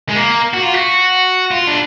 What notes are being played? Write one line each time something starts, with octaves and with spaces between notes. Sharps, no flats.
G#3
A#3
F#4
F4
F#4
F4
D4